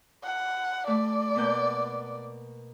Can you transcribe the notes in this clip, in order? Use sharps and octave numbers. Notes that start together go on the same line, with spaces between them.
F#5
A3 D5
B2 A#3 G6